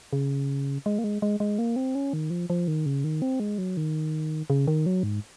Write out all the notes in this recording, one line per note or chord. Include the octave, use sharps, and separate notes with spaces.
C#3
G#3
A#3
G#3
G#3
G#3
A#3
C4
C#4
D#3
F3
F3
D#3
C#3
D#3
C4
G#3
F#3
D#3
C#3
D#3
F#3
G#2